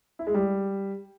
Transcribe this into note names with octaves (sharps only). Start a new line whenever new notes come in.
E4
G#3
G3